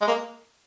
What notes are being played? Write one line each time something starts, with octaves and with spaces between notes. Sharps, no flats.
G#3
A#3